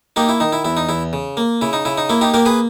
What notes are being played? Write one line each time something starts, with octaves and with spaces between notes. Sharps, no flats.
A#3 D#4 G4
E4
D#3 D#4
E4
E2 E4
D#4
E2 E4
C#3
A#3
C#3 E4
D#4
C#3 E4
D#4
A#3 E4
D#4 G4
A#3 G4 A#4
G#4 B4